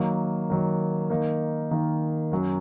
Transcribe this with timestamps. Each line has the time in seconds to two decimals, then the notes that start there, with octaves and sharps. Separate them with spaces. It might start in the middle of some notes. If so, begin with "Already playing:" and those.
Already playing: D#3 F#3 A#3
0.50 D#3 F#3 A#3
1.10 D#3 A#3 D#4
1.71 D#3 A#3 D#4
2.31 F#2 F#3 C#4